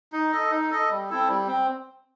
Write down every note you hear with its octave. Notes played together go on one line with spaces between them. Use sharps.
D#4
A4 D#5
D#4
A4 D#5
G3
C4 E4 A4
G3
C4